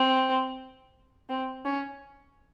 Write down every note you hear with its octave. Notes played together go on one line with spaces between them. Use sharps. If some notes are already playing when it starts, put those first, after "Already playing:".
Already playing: C4
C4
C#4